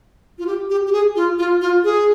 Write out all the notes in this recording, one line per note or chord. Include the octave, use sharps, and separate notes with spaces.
F4
G4
G4
G4
G#4
F4
F4
F4
G#4